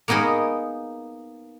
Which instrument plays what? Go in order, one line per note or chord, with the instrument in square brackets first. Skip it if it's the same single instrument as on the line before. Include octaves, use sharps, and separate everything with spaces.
[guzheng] A#3 B3 D#4 G#4 A#4